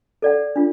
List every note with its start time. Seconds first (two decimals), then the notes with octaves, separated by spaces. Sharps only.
0.22 A4 D5 F#5
0.56 D4 F4